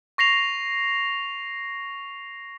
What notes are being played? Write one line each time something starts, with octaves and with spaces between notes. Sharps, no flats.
C#6 A#6 C7 F7